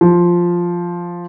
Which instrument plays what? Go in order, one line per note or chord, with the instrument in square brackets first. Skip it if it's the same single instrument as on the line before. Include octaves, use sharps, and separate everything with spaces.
[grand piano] F3